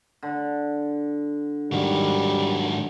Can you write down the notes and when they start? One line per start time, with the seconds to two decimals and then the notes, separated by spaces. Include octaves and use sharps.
0.23 D3
1.72 G#2 D#3 F#3 G3